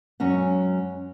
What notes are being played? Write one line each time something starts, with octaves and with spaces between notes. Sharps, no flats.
F#2 F#3 G#3 C#4 F#5